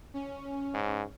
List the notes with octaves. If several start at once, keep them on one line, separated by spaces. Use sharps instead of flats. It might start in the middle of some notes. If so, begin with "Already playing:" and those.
C#4
G#2